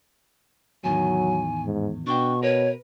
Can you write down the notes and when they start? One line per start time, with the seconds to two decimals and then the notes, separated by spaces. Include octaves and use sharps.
0.84 E2 A2 D#3 F#3 G#5
1.65 G#2
2.07 B2 D4 G5 C#6
2.43 A#4 B4 C#5